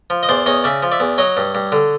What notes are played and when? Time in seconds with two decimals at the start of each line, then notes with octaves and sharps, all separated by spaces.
0.10 F3
0.23 D#5
0.29 E2 C5 D5
0.46 E2 C#5 D#5
0.64 C#3 D5 E5
0.83 F3
0.92 D5 E5
1.00 E2
1.18 F#3 C#5 D#5
1.37 G2
1.55 G2
1.72 D3